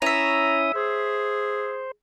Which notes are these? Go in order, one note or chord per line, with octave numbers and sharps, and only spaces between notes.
C#4 E4 C#5 E5 A#5 D#6
G#4 C5